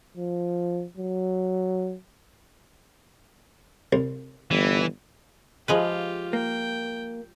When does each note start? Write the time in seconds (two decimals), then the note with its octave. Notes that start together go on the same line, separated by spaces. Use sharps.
0.17 F3
0.97 F#3
3.93 C2
4.51 G1 E3
5.68 F3 G#3 F4 G4 B4
6.33 A#3 G5